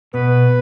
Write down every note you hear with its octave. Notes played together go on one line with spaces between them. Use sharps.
B2 B4